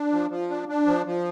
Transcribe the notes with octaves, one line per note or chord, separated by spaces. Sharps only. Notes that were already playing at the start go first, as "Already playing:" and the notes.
Already playing: D4
F3
F3
D4
D4
F3
F3